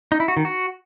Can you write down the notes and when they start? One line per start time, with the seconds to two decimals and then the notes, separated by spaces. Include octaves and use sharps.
0.12 D#4
0.20 E4
0.28 F#4
0.37 D#3
0.45 F#4